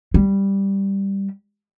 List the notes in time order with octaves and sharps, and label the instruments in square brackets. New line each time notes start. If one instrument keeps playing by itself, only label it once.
[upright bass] G3